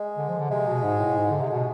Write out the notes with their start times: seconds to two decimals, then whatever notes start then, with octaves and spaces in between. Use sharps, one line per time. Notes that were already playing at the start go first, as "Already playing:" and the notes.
Already playing: G#3
0.18 D3
0.29 F3
0.39 D3
0.50 C3 G#3
0.67 B2
0.84 G#2
1.00 A2
1.17 G#2
1.30 D3
1.41 C3
1.50 B2 G#3